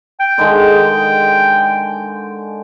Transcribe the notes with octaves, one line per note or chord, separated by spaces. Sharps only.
G5
D3 D#3 G#3